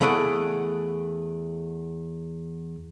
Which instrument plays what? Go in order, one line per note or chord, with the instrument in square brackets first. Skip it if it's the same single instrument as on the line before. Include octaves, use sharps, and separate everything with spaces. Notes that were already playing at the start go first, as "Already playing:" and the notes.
[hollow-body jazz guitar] E2 A3 G#4 D5 F#5